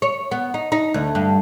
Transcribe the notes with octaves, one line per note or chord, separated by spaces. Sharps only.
C#5
B3
D#4
D#4
D2
G2